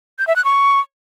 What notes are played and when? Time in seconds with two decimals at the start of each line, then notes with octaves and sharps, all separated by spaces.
0.19 G6
0.27 E5
0.36 F#6
0.45 C#6